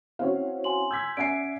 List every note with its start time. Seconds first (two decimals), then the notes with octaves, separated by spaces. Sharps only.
0.19 C4 C#4 E4 F#4 C#5 F5
0.64 G#5 C6 F#7
0.91 E6 G6 G#6 B6
1.17 C#4 D5 E5 F#5 G#5 C7 D7